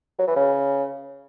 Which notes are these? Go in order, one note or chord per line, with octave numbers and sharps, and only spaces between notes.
F#3
E3
C#3